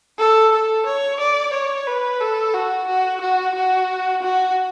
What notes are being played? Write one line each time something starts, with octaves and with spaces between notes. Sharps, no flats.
A4
A4
C#5
D5
C#5
B4
A4
F#4
F#4
F#4
F#4
F#4